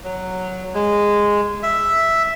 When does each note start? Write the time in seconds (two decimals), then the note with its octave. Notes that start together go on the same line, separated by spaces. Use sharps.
0.04 F#3
0.74 G#3
1.63 E5